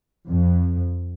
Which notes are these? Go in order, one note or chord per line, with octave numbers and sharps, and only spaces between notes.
F2